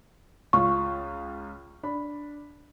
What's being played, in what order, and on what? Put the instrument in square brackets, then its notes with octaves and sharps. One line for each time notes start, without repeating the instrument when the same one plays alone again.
[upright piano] C#2 F4 F5 [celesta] C#6
[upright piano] D4 B5